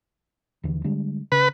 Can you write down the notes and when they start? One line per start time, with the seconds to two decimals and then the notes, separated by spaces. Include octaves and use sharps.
0.64 D#2 D3 E3
0.84 D3 G3 G#3
1.32 C#3 B4